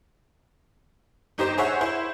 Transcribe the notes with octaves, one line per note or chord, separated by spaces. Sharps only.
G1 D#4 G4 C5
G#4 C5 C#5 E5 F#5 G#5
E4 C5